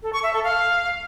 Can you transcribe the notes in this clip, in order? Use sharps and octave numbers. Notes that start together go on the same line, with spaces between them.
A4
C#6
E5
A4
F5